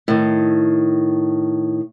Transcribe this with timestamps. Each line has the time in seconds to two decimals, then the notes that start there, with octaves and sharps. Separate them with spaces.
0.08 A2 D#3